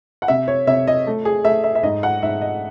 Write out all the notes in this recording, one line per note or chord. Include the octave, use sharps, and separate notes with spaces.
F#5
C3 E5
C#5
C3 E5
D#5
A3
G#4
A3 E5
E5
E5
G#2 D#5
F#5
G#2 E5
D#5